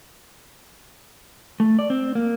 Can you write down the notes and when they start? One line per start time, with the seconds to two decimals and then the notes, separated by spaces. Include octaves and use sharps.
1.60 A3
1.79 D5
1.90 C4
2.15 A#3